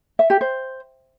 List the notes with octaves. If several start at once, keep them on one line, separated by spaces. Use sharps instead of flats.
E5
G4
C5